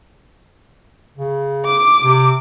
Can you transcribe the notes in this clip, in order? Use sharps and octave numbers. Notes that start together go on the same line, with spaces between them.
C#3
D6
C3